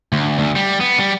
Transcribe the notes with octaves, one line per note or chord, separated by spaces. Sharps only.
D2
D2
G3
B3
G3